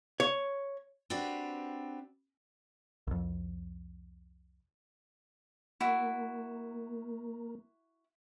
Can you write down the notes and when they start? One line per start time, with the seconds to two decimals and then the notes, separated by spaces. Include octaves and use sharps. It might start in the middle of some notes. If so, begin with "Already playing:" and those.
0.20 C#5
1.10 C4 D4 F#4 G4 B4
3.07 C2 F2
5.80 A#3 E4 F#4